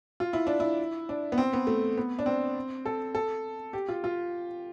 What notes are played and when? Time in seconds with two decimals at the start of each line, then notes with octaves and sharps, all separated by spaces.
0.20 F4
0.33 E4
0.47 D4
0.60 E4
1.09 D4
1.32 B3
1.38 C4
1.53 B3
1.67 A3
1.98 B3
2.19 D4
2.26 C4
2.86 A4
3.15 A4
3.73 G4
3.89 F4
4.04 F4